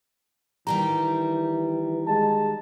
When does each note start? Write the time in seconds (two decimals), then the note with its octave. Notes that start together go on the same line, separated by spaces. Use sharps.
0.67 D#3 E3 G3 G4 A#5
2.07 G#3 A5